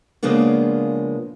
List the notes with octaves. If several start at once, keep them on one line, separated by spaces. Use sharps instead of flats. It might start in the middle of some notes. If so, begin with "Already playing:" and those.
C#3 F3 G#3 A#3 B3 D4